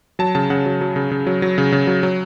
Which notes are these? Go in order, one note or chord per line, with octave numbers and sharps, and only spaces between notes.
F#3 A5
C#3 A5
C#3 F#5
F#3
F#3
C#3
C#3
F#3
F#3
C#3
C#3
F#3
F#3